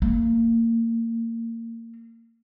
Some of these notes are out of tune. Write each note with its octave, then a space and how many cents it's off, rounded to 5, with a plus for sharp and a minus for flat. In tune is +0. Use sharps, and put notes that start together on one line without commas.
A#3 -25